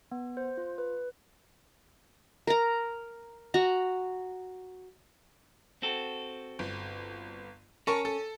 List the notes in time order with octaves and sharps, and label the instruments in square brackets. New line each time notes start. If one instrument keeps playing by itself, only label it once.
[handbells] B3
C5
F4
B4
[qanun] A#4 A#5
F#4 A#5
[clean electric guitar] C4 F#4 A4
[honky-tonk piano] G1
[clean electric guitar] C#4 [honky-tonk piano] A#4 A5 C#6
[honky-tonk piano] A4